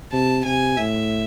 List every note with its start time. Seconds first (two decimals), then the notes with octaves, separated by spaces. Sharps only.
0.13 C3 A5
0.45 C3 G#5
0.77 A2 E5